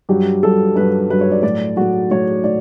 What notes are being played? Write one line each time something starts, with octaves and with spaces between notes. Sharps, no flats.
G2 F#3 G4
G2 F#3 A4
G2 F#3 B4
G2 F#3 B4
C#5
D5
A2 F#3 D5
A2 F#3 F#4
A2 F#3 C#5
A2 D5